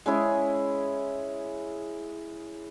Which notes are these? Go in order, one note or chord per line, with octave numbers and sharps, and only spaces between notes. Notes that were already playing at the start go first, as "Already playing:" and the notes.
G#3 C#4 E4 G#4